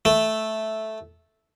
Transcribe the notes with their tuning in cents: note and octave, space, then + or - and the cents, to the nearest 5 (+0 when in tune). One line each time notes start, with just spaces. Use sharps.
A3 -5